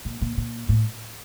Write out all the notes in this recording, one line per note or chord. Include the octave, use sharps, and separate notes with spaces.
A#2
A#2
A#2
A2